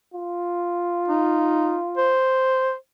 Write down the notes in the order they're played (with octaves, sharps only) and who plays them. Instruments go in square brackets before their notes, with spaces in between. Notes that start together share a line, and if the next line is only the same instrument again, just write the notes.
[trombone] F4
[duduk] D#4
C5